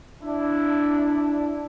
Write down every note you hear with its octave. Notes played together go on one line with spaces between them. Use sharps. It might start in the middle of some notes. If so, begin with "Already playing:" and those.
D4 E4